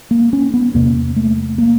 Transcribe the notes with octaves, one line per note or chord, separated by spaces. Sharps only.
A#3
C#4
B3
E2 C3 A#3
A3
A#3